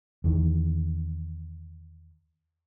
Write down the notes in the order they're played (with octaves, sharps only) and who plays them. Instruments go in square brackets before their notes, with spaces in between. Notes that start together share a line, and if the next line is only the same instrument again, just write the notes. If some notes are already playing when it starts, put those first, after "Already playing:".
[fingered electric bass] E2 D#3